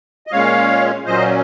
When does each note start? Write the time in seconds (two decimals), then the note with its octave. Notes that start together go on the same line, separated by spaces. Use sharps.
0.27 D#5
0.31 A#2 G#3 C#4 C#5 F5
1.06 A#2 F#3 C#4 C5 D#5